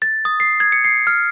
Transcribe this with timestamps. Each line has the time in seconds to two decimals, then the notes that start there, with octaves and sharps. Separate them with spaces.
0.02 A6
0.25 D#6
0.40 C7
0.60 G#6
0.72 C#7
0.84 C7
1.07 F6